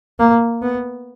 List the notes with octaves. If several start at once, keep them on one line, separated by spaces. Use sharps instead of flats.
A#3
B3